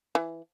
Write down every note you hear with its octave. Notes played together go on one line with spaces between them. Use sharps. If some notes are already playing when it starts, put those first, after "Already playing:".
E3